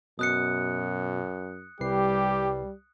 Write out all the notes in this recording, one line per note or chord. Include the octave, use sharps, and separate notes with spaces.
F#2 B2 D#6 F#6 C#7
C2 G3 G4 B4 C7